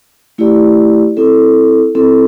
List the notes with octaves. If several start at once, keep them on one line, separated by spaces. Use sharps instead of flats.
A3 E4 G4 D5
C4 E4 A4
C4 E4 A4